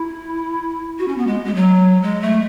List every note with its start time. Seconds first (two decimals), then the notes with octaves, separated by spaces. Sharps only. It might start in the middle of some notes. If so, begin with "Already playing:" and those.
Already playing: E4
0.98 F#4
1.07 C#4
1.17 B3
1.26 G#3
1.45 G#3
1.55 F#3
2.02 G#3
2.21 A3